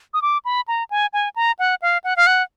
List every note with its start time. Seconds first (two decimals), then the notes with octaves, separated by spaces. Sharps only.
0.14 D#6
0.22 D6
0.45 B5
0.68 A#5
0.91 G#5
1.13 G#5
1.36 A#5
1.59 F#5
1.82 F5
2.04 F#5
2.16 F5
2.27 F#5